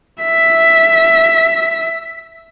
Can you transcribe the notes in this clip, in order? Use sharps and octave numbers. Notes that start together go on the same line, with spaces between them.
E5 B6